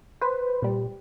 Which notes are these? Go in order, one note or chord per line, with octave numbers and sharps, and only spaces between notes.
B4 C5
A#2 G3